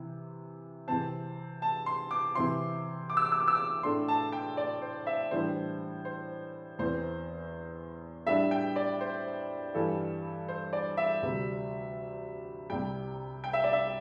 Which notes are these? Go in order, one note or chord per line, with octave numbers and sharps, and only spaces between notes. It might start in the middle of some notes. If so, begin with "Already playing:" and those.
Already playing: C3 E3 C4 E4
C3 E3 C4 A5
A5
C6
D6
C3 E3 C4 E4 C6
D6
E6
D6
E6
D6
E6
D6
A2 A3 D4 C6
A5
G5
D5
C5
E5
A2 E3 G3 D4 C5
C5
E2 E3 C4 C5
A2 G3 D4 E5
G5
D5
C5
G2 E3 G3 A4
C5
D5
E5
D2 C3 G3
C2 C3 G3 G5
G5
E5
D5
E5